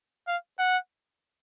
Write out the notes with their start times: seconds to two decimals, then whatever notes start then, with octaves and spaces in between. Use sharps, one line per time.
0.27 F5
0.59 F#5